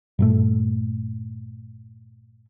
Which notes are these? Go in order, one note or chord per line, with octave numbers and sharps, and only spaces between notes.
G2 A#2 A3